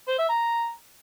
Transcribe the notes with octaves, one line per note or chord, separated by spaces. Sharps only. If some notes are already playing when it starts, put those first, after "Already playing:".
C5
E5
A#5